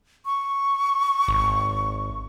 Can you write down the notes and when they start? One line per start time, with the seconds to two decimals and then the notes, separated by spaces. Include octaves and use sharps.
0.26 C#6
1.28 G#1